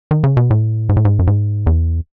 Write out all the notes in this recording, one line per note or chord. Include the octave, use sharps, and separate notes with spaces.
D#3
C#3
B2
A2
G#2
A2
G#2
F#2
G#2
E2